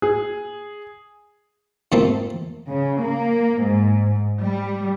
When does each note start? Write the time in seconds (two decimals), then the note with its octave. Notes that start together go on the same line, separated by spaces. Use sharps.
0.02 G#4
1.92 G#2 C3 A3 A#3 C4 F4
2.69 C#3
3.01 A#3
3.64 G#2
4.40 G3